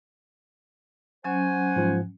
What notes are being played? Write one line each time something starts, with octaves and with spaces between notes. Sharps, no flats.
F#3 C#4 C5 F#5 G#5
G#2 F3